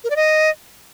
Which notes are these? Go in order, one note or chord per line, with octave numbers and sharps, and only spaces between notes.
A#4
D5
D#5